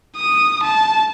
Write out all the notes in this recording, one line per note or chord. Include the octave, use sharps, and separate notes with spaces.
D#6
A5